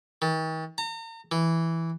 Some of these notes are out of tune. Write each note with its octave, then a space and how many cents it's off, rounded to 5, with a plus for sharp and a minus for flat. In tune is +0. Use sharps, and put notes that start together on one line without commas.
D#3 +45
A#5 -40
E3 +0